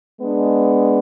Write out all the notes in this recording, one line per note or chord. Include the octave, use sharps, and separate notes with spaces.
G#3 B3 D4